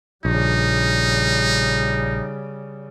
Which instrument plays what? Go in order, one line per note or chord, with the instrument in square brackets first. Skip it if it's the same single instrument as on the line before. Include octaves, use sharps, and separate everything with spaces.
[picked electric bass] A#1 [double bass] C#3 G3 [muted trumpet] D#4